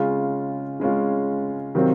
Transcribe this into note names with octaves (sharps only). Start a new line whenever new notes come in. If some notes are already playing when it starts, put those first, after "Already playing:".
Already playing: C#3 G#3 C#4 F4
C#3 G#3 C#4 F4
C3 D#3 F#3 C4 F4